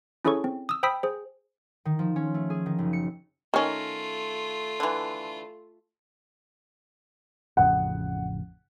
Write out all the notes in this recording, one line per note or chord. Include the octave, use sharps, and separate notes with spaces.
C#4 E4 G#4 A4 C#5 C#6
C4
D#6 E6
C5 G5 B5 D#6 E6 B6
G#4 C5
D#3
F3
C#4
A3
G#4
D#3
F#1
C#7
D#3 A3 C#4 F4 A#4
D3 E3
A1 F2 C#3 F#5